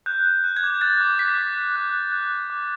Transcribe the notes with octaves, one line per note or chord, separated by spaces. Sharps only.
F#6 G6
F#6
F#6
G#6
D6
F#6 A6
D6
D6 B6
D6
F#6
F#6
F#6
F#6
F#6
D6